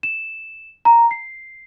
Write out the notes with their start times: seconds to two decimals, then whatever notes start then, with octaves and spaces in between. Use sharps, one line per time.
0.03 E7
0.85 A#5
1.11 C7